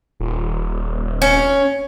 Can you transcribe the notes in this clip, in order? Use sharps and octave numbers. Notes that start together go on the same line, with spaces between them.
D#1
C#4